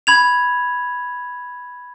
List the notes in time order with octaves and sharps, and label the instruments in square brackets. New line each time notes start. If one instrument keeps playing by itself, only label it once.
[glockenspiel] B5 G#6 F7